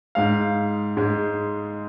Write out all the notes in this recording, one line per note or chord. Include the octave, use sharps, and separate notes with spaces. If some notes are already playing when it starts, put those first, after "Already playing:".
G#2 G#3 F5
G#2 G#3